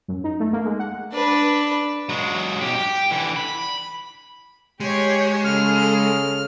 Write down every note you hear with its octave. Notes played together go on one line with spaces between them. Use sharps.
F#2
D#4
A3
A#3
G#3
F#5
D4 B4
F#3 G#3
B1 G4
G4
D3 E3
B5
G#3 G4 C#5
C#3 A4 F6